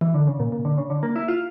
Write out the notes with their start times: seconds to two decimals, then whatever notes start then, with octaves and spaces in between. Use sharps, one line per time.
0.01 E3
0.14 D3
0.27 C#3
0.40 A#2
0.52 A#2
0.65 D3
0.78 C#3
0.90 D3
1.03 A#3
1.16 E4
1.28 F4